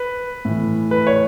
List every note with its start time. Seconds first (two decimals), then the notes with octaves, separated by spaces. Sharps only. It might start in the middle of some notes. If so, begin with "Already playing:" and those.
Already playing: B4
0.45 A2 E3
0.91 B4
1.07 C#5